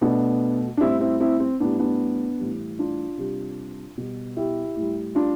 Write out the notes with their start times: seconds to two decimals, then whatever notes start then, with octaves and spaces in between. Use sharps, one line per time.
0.01 B2 A3 B3 D4
0.77 D4
0.81 A2 G3 C4 E4
1.00 C4 E4
1.20 C4 E4
1.40 C4
1.60 A2 G3 B3 D4
1.79 B3 D4
2.39 A2 E3 G3
2.79 D4 F4
3.17 C3 G3
3.98 B2 G3
4.37 E4 G4
4.77 A2 G3
5.15 D4 F4